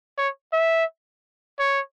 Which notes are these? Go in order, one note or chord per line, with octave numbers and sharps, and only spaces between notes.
C#5
E5
C#5